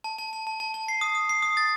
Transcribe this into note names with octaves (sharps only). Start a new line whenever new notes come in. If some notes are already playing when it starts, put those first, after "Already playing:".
A5
A5
A5
A5
A5
A5
C7
D#6
D#6
C7
D#6
A6